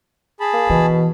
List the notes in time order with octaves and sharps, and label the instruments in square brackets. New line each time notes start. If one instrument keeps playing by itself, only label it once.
[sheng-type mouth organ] G#4 A5 B5
[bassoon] A#3
[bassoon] B2 [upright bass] E3